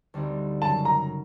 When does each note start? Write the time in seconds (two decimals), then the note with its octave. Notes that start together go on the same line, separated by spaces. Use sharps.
0.14 D2 D3 G3 C4 D#4
0.62 F#2 C#3 F#3 A5
0.85 A#5